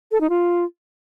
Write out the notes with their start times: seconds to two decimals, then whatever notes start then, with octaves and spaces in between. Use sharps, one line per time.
0.12 A4
0.21 D#4
0.30 F4